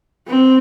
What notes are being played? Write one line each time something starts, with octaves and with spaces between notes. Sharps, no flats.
C4